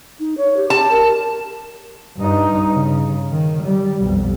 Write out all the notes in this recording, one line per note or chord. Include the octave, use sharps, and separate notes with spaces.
D#4
C#5
G4
G4 A5
A#4
G2 D#4
C#3
D#3
G3
B1 F2